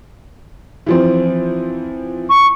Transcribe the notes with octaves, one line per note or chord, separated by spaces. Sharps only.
E3 F3 C4
C#6